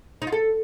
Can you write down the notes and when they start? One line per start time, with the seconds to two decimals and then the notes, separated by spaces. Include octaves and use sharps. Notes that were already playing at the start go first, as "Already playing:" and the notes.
0.22 D#4
0.27 F4
0.32 A4